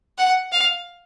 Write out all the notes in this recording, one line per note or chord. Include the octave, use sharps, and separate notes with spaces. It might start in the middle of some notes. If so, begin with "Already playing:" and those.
F#5
F5